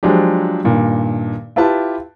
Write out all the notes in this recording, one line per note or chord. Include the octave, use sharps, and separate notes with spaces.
F3 F#3 G#3 D4 G4
G2 A#2 D#3
E4 F4 G4 B4 A5